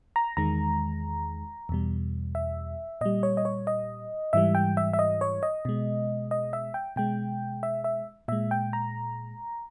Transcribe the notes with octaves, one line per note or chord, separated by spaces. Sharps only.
A#5
E2 D#3 G#3 A#5
E2 B2 G3
E5
A#2 G3 D#5
C#5
D#5
C#5
D#5
G#2 E3 G3 E5
G5
E5
E5
D#5
C#5
D#5
B2 G#3
D#5
E5
G5
B2 G#3 G5
E5
E5
A#2 G#3 E5
G5
A#5